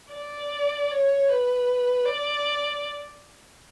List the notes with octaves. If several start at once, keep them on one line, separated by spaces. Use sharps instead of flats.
D5
C#5
B4
D5